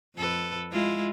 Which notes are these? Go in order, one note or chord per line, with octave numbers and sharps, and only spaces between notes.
F2 A4 B4
G#3 E4 F4